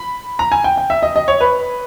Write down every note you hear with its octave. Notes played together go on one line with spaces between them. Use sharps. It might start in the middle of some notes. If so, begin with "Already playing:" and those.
Already playing: B5
A#5
G#5
G5
G5
E5
D#5
D#5
C#5
B4